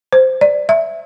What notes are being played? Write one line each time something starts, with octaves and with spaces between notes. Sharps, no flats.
C5
D5
E5